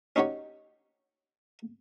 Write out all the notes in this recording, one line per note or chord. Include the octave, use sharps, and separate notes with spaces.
C#4 D#4 F#4 G4 C#5